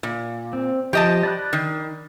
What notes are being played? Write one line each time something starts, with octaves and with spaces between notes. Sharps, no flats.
A#2
C4
F3 G4 D#5 A5
D5 B5 F#6
D#3